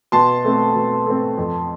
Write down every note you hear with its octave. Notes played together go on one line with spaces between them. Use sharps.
B2 A5 C6
A3 C4
B2
A3 C4
F2